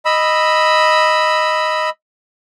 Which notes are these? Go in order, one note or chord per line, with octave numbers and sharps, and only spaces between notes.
D#5 B5 E6